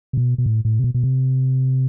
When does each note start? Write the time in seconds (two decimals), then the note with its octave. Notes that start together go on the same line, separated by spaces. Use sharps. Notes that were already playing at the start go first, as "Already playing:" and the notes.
0.13 C3
0.17 B2
0.38 B2
0.46 A2
0.65 A2
0.79 C3
0.84 B2
0.94 B2
1.04 C3